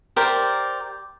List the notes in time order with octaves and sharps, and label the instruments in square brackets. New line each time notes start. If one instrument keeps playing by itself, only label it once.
[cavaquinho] G4 A#4 C5 D5